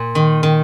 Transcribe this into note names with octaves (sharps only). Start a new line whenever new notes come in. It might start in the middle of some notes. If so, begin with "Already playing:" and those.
Already playing: A#2
D#3
D#3